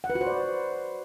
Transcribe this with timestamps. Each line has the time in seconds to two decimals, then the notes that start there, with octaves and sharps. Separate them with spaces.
0.04 F#5
0.10 B4
0.15 F#4
0.21 C5
0.27 D5